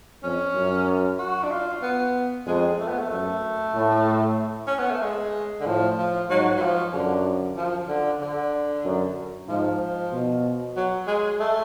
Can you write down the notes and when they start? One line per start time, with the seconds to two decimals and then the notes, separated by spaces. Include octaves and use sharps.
0.23 F2 C#4
0.55 F#2
1.19 F#4
1.43 D4
1.52 F4
1.83 B3
2.46 F2 G#3
2.79 A3
2.89 B3
2.99 A3
3.10 F#2 A3
3.75 A2
4.67 C#4
4.79 B3
4.91 A3
5.02 G#3
5.60 D3
5.66 A2 F3
5.98 F3
6.29 G#2 F#3
6.57 F#3
6.62 F3
6.93 F#2 D3
7.57 F3
7.88 D3
8.21 D3
8.85 F#2
9.48 G#2 F3
10.12 B2
10.76 F#3
11.07 G#3
11.40 A3